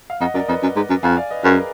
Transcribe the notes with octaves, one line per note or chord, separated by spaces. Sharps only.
F5
F2 D#5 F#5
F#2 A#4 D5
F2 B4 D#5
F#2
G#2
F#2
F2 F5 G#5
D5 F5
B4 D#5
F#2 G#4 B4
A#4